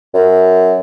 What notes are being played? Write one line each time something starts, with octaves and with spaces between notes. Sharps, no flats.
F#2